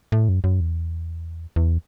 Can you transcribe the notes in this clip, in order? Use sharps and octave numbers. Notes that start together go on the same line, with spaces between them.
A2
F#2
F#2
E2
E2